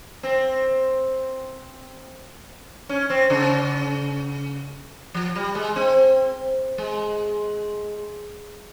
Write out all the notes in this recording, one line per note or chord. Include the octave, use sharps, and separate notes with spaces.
C4
C#4
C4
C#3
F3
G3
G#3
C4
G#3